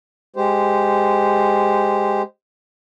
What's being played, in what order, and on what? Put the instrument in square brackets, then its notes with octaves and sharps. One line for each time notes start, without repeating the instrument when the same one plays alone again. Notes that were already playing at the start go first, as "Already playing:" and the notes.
[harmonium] G#3 G4 C5